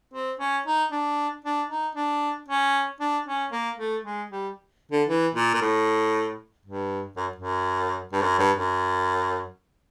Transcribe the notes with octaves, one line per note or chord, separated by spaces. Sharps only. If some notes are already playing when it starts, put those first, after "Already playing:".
C4
C#4
D#4
D4
D4
D#4
D4
C#4
D4
C#4
A#3
A3
G#3
G3
D3
E3
A#2
A#2
A2
G2
F#2
F#2
G2
F#2
G2
F#2